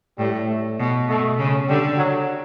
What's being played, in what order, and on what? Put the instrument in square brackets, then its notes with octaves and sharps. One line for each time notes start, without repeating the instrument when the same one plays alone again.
[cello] A2 [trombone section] G3
[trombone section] A3
[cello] B2
[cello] B2 [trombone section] A3
[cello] C#3
[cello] D3 [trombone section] G3
[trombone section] F#3